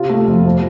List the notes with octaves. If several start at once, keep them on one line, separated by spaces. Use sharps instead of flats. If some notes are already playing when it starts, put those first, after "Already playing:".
Already playing: C3 F4
A3
F2
F3